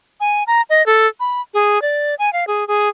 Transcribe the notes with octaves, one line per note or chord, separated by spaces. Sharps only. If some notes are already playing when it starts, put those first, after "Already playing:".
G#5
A#5
D#5
A4
B5
G#4
D5
G#5
F5
G#4
G#4